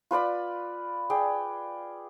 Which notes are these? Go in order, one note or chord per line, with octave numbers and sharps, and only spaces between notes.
F4 B4 D5 B5
G#4 D5 G5